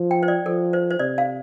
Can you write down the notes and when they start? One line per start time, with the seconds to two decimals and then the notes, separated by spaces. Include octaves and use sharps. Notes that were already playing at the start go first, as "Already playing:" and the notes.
Already playing: F3
0.11 G5
0.23 C5
0.28 D5
0.46 F3 A4
0.73 C5
0.91 C5
0.99 C3 D5
1.18 F5